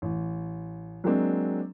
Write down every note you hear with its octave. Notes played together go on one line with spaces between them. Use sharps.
A1
F#3 G#3 A#3 C4 D4